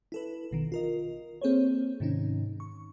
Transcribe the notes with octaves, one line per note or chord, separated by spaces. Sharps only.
E4 A4 B4
A#1 B2 D#3
F4 A#4 D#5
A#3 C4 G#4 A4 C5 C#5
G#2 C3 D#3 C#4 D#4
C#6